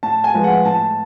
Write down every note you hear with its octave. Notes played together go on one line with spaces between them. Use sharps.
A2 A5
G#5
F3 G#3 B3
F#5
A2 A5